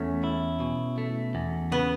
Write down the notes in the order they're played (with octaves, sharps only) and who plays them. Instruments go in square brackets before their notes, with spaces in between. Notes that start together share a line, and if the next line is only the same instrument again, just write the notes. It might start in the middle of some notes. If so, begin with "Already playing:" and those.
Already playing: [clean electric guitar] E2 A3 [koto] C#4
[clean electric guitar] E4
B2
A3
E2
[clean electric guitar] C#3 [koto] B3